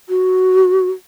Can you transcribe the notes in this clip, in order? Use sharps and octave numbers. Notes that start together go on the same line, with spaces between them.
F#4